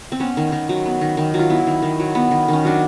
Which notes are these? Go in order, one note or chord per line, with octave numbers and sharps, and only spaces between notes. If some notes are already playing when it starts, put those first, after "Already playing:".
C4
B3 C#4
D#3
D#3
F#3
B3
D#3
D#3
F#3
F4
B3 E4
D#3
D#3
F#3
B3
D#3
D#3 C#4
F#3 D4